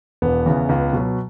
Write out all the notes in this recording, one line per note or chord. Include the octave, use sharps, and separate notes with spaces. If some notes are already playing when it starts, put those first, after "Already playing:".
E1 B3
E2 C#3 E3
C#2
B2 F#3